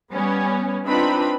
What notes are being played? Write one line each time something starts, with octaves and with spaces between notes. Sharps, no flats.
G3 B3 C#4
C4 D4 D#4 F4 B4 B5